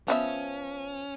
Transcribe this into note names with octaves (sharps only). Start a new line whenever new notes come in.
F3 B3 C#4 E5